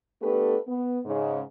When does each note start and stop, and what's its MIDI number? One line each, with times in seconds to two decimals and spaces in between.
0.22 0.57 57
0.22 0.57 59
0.22 0.57 62
0.22 0.57 67
0.22 0.57 69
0.22 0.57 71
0.67 0.99 59
1.05 1.42 44
1.05 1.42 49